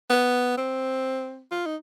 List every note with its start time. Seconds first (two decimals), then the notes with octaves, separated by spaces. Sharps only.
0.10 B3
0.58 C4
1.52 F4
1.66 D#4